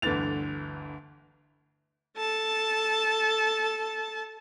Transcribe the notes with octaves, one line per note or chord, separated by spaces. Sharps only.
G1 D2 D3 E3 A6 F7
A4 A5